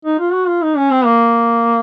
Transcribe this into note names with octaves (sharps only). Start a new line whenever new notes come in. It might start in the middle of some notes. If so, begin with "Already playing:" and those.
D#4
F4
F#4
F4
D#4
C#4
C4
A#3